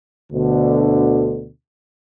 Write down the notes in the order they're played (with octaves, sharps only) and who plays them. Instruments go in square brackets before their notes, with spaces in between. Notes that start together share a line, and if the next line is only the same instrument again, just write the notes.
[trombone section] D2 B2 D3